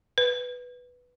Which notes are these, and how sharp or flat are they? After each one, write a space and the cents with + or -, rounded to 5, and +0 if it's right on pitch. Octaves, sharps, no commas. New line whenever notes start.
B4 +0